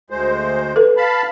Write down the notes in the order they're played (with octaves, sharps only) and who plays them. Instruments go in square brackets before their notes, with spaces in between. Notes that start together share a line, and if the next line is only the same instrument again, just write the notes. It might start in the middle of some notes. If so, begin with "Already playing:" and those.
[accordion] D2 G#3 C5
[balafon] A4 B4
[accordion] F5 A5 B5